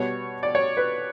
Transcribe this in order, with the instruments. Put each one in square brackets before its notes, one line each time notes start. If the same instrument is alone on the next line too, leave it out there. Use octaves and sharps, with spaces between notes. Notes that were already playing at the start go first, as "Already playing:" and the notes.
Already playing: [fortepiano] B2 G3 B3 C#5
D5
C#5
B4